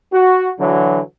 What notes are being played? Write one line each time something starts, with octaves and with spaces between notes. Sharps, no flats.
F#4
D3 E3 F#3